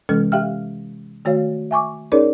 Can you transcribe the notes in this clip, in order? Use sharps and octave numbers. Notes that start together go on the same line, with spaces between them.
C3 E3 G#3 C#4 A4 F6
G4 E5 F5 G5 F6
D#3 A3 F#4 C#5 F5
E5 G#5 C#6 D6
C#4 D#4 G#4 A#4 C#5 D5